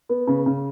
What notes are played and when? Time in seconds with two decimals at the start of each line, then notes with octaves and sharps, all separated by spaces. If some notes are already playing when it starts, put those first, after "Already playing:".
0.09 B3
0.27 C#3
0.46 C#3